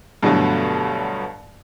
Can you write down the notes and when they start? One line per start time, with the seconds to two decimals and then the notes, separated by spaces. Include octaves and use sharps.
0.23 G2 B2 D3 F#3 A3